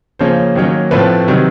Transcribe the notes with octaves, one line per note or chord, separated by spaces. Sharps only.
C#3 F3 A#3 C#4 C5
D#3 F#3 A#3 C#4
A2 F3 A3 C4 B4
C3 D#3 F#3